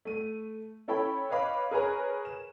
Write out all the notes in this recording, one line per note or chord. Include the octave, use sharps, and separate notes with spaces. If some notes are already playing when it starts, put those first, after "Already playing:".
A3 D#7
C#4 E4 A4 C#5 G5 B5
B4 C#5 D#5 F5 B5 D6
G#4 A#4 B4 C#5 G#5 A#5
E7